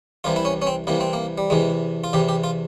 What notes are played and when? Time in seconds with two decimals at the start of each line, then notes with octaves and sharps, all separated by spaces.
0.24 C2 C3 E3 F4
0.36 E4
0.45 C#4
0.62 C#4
0.67 C4
0.87 C2 C3 E3 A#3
1.01 C4
1.13 A#3
1.38 G3
1.50 E2 C3 E3 G#3
2.04 F4
2.13 E2 C3 E3 G4
2.29 G4
2.44 F4